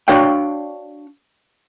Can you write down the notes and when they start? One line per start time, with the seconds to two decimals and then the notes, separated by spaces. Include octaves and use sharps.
0.08 D4 F#4 C#5 F5 G5